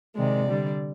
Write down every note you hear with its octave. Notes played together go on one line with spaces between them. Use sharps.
C3 D#3 G#3 D5
D3 G3